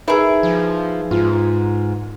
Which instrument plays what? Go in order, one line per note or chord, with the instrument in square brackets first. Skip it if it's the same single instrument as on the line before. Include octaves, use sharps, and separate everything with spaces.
[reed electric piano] D#4 A#4 B4 [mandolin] E4 G#4
[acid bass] F3
[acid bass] G#2 [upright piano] F4